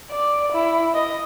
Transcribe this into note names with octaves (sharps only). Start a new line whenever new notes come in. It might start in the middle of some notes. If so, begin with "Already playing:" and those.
D5
E4
D#5